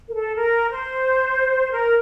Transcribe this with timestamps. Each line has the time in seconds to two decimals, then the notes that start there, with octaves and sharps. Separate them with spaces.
0.08 A#4
0.13 A4
0.36 A#4
0.70 C5
1.71 A#4